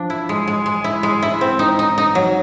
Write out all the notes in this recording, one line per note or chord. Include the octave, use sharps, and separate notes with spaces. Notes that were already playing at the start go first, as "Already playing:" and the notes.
Already playing: F3 D4
E4
G#3
G#3
G#3
E4
G#3
E4
C4
D#4
D#4
D#4
F#3